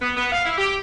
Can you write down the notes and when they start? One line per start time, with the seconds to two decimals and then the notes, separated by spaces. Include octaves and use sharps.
0.01 B3
0.17 B3
0.32 F5
0.44 E4
0.57 G4